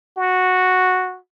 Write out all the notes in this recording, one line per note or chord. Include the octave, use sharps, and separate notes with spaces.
F#4